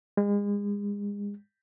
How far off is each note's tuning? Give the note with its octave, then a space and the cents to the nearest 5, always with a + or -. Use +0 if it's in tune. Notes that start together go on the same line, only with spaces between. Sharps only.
G#3 -35